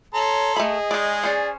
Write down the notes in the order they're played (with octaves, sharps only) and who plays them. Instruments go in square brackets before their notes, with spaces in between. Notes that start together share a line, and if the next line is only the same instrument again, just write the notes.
[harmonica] A4 A#5 C6 [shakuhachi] C#5
[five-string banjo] A3 B5 [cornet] G#4 [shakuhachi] D#5
[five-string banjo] D#3 D5 [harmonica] G#3
[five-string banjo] C#4 C5 [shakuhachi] D5